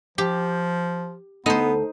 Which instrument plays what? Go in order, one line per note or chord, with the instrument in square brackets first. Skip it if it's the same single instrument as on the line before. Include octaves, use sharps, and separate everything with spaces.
[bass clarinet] F3 [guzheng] G4
[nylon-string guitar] D2 A4 [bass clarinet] B3 [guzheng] D#4 C5